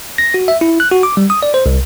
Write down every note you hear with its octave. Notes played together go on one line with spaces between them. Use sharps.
A#6
F#4
E5
E4
F#6
F#4
D6
G3
D#6
D5
C5
C2